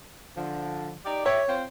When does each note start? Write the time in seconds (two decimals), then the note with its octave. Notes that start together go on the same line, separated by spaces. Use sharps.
0.37 D3 F3
1.05 D#4 G4 D5
1.26 G4 C#5 E5
1.48 C4 F4 C5